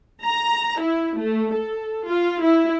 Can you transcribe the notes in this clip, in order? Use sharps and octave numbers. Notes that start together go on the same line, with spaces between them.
A#5
E4
A3
A4
F4
E4